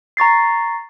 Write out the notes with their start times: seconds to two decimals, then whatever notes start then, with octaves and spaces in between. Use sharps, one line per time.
0.17 A#5 C#6 A6 C7